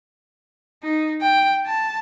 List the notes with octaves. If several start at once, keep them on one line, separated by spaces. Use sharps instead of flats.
D#4
G5
A5